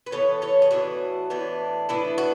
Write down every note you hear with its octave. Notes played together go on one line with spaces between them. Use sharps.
B4
A2 E3 B3 A4 C#5
A4 C#5
G#4
A2 E3 B3 D4 F#4
A2 E3 B3 D4
A2 E3 B3 D4 E4
F#4